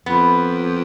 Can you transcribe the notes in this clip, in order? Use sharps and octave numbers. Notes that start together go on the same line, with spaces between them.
F2 B3